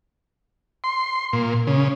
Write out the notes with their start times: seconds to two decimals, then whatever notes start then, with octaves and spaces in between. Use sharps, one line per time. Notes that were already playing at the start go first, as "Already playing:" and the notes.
0.84 C6
1.33 A#2
1.67 C#3